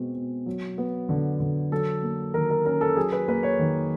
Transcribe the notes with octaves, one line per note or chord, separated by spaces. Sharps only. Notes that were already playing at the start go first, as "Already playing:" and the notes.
Already playing: B2 G#3 C4
B2
F#3
B3
D3
D3
F#3 A4
A#3
D#3 A#4
A#4
C#4 A#4
A4
F#3 G#4
B4
A#3 B4
C#5
D#3